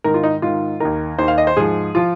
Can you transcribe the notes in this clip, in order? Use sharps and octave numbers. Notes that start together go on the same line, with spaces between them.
G#2 D#3 A#4
F4
D#4
G#2 D#3 F4
D#2 D#3 A#4
D#2 D#3 C5
F5
D#5
C5
G#2 F3 G#4
F3 F4